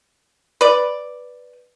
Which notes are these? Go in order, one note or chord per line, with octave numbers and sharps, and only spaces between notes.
B4 D5